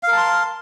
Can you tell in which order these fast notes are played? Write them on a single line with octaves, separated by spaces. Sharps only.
F5 A#4 A5 C6